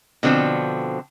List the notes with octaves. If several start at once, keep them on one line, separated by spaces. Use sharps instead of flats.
B2 D3 F3 C4 A4